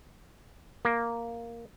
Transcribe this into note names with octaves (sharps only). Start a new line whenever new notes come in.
A#3